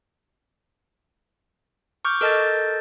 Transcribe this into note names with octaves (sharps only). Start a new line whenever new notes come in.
C#6 D6 F6 G6
A4 A#4 D#5 A5 G6 A6